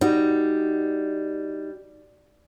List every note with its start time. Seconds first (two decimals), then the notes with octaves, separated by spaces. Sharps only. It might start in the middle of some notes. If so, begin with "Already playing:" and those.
0.01 G3 D#4 F#4 D#5